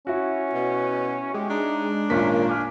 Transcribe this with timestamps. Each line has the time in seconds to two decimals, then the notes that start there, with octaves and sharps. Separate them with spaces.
0.07 C#4 E4 F#4
0.54 B2
1.34 G#3 G4
1.50 D4 D#4
2.10 G#1 A#2 A#3 C#4 B6
2.49 G#5 D6 F6